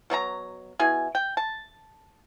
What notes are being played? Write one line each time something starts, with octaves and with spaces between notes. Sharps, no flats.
B2 F#3 C4 A#5
B2 E4 G#4 G#5
G5
A5